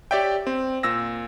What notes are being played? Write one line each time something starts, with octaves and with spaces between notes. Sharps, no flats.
G4 C#5 D5 E5 G5
C4
A#2 E6 A#6